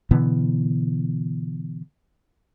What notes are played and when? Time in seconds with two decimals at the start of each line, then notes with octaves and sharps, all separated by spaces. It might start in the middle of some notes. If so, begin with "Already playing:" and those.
0.11 B2 D3 E3 B3